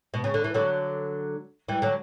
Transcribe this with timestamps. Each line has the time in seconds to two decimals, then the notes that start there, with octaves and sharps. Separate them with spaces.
0.14 B2
0.24 C#3
0.34 D3
0.44 E3
0.54 D3 F#3
1.68 E3 G3
1.82 D3 F#3